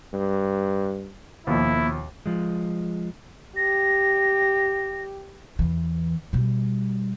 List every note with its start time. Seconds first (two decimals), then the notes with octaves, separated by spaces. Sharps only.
0.13 G2
1.47 D#2 B2 F3 A#3 E4
2.26 F3 G#3
3.56 G4 A#6
5.59 E2 E3
6.33 B2 G3